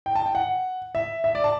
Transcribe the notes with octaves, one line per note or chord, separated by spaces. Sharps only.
G5
A5
G5
F#5
E5
E5
D5
A5